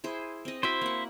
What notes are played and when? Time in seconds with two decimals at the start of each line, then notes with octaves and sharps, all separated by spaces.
0.04 E4 G#4 C5
0.45 C4 D#5
0.63 E4 F#4 C5 E5 G5
0.81 A#3 F#5